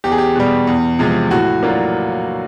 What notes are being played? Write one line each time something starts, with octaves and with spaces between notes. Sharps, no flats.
E2 G4
G#4
G4
B2 G3
E2
C3 F3 G#3
A2 F#4
F#3 A#3 D4 F4